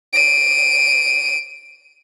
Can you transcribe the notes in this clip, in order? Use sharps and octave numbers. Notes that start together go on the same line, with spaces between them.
D7 D#7